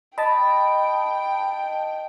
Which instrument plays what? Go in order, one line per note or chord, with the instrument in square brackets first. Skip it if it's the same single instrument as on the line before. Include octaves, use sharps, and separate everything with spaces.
[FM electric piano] D#5 A5 [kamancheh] G5 [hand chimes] B5